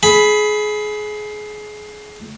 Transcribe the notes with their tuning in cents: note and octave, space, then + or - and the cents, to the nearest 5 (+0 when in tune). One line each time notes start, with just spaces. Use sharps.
G#4 +25 B5 +0